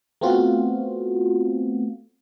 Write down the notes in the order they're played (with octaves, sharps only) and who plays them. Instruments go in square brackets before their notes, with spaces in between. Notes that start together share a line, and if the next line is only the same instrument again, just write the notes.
[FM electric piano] A3 B3 C4 F4 F#4